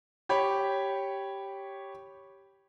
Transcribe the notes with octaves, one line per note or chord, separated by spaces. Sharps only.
G4 C#5 B5